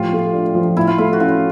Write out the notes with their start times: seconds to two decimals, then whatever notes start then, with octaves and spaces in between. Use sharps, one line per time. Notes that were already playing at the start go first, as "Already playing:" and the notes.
Already playing: A2 F3 F4 G4
0.13 A3
0.33 D4
0.55 F3
0.77 A2 E4
0.87 F4
0.98 A3 E4
1.13 F#4
1.20 C#4 F4